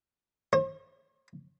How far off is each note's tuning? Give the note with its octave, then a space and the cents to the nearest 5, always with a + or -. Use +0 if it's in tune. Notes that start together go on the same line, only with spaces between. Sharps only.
C5 +45